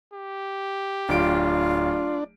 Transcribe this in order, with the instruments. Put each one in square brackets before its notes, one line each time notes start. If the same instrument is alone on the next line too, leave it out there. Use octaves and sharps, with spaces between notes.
[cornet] G4
[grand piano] D1 D7 [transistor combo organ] D4 [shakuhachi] F4